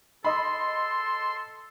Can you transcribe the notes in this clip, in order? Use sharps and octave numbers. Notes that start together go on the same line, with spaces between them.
A4 D#5 B5 C6